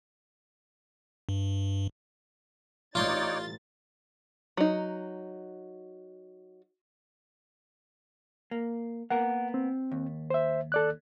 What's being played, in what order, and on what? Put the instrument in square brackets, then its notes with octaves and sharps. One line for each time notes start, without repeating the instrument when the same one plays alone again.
[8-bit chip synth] G2
[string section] A1 A6 [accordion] D#4 C#5 D5 [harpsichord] F4 C6
[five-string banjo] F#3 D#4
[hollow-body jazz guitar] A#3
[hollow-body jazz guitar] A#3 B3 A#4 [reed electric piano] F#5
[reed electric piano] C4
[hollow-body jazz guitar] D#2
[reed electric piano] C5 E5
A4 D5 F#6